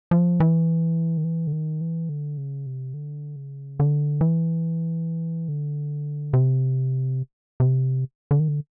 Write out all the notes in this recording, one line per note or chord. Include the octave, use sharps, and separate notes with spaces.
F3
E3
D#3
E3
D3
D#3
E3
D3
C#3
C3
D3
C#3
D3
E3
D3
C3
C3
D3
D#3
D3